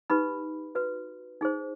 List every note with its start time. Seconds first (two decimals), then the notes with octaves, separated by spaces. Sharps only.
0.10 D#4 G4 B4 B5
0.75 F#4 B4
1.41 D#4 G#4 C5